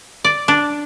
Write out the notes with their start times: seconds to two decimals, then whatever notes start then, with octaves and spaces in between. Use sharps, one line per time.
0.24 D5
0.48 D4